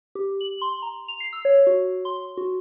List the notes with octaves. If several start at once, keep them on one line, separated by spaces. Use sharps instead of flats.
G4
F#7
C6
A#5
F7
C7
E6
C#5
F#4
C6
F#4